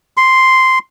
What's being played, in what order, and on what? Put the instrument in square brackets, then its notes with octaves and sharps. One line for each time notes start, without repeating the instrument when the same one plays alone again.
[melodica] C6